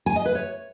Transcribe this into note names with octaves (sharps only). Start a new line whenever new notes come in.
G#5
D#5
B4
C#5